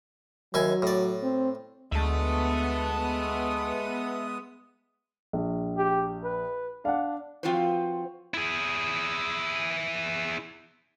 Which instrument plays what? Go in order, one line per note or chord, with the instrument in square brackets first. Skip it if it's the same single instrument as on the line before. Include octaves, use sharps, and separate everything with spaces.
[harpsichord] D#2 E4 G#5 [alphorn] F#3
[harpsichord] A2 D5
[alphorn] C4
[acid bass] D2 [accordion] G#3 D#6 [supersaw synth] B3 [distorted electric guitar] E5 A5
[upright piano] A#1
[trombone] G4
B4
[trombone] D4 [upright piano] F5 F#5
[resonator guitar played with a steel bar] F3 C4 F4 F#4 B4 C5
[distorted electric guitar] E4 G#4